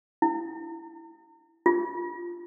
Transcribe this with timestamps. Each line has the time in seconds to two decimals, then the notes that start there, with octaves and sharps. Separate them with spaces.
0.22 E4
1.66 F4